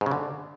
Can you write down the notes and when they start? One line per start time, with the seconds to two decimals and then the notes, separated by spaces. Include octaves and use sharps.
0.01 G#2
0.06 C#3
0.11 D3